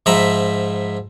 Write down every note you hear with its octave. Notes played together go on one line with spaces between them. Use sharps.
G#2 F3 E5 A#5 B5